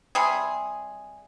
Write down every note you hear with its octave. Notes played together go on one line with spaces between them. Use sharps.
C3 G3 G#4